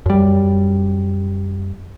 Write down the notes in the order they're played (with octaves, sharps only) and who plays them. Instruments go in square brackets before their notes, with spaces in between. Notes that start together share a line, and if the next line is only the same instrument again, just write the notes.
[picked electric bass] F#2 G3